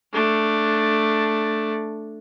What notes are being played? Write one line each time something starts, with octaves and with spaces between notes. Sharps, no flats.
A3 D4